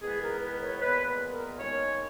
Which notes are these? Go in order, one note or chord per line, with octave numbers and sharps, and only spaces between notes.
E2 D#3 G#3 B3 G#4
A#4
B4
C#5
A#2 G#3 B3 B4
B4
A#4
D#2 C#3 G#3 C#5